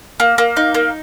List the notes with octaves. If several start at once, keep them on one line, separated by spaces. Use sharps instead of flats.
A#3
A#3
D#4
A#3